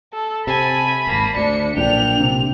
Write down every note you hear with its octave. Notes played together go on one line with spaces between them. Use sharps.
A4
C3 G#5 A5 B5
D#1 G#1 A#3
D2 A3 D4 C#7
B1 A#2 F3 D4 G5 F7
C3